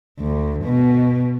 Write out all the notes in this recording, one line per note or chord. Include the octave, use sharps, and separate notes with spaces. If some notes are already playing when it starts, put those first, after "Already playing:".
D2
B2